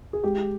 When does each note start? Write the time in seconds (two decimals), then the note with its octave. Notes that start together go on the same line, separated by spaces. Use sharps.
0.13 G#4
0.23 G#3 G4